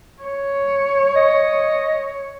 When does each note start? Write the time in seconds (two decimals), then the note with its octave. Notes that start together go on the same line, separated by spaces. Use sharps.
0.23 C#5
1.16 D#5